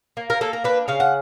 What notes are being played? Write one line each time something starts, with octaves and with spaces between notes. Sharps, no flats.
A#3
A#4
A#3 A4
A#4
D4 B4
C#3 F5
F#5